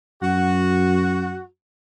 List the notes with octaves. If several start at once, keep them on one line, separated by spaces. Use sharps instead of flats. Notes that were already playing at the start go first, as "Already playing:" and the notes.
F#2 F#4